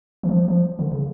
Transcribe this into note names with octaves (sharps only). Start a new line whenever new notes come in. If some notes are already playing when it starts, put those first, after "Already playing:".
E3
F3
F3
D3
C#3